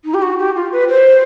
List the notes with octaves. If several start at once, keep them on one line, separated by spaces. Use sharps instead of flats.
D#4
G4
F#4
G4
F4
B4
C5